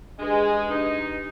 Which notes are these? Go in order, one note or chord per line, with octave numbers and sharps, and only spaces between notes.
G#3 D4 G4 B4
D4 D#4 G4 B4